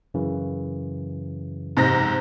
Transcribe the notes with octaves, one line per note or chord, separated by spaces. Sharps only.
F#2 C#3 E3
G#2 C3 A#6